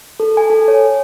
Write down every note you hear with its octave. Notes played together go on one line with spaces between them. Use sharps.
A4
G#5
A4
C#5